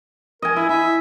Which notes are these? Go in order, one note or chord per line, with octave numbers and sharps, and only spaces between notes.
A#4 D#5 G#5
E4 E5
E4 E5